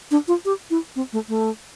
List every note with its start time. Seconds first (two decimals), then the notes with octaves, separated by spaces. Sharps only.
0.11 D4
0.28 F4
0.45 G4
0.70 E4
0.96 C4
1.13 A3
1.29 A3